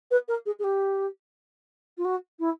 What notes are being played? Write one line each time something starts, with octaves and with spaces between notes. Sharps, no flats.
B4
A#4
G#4
G#4
G4
F4
F#4
E4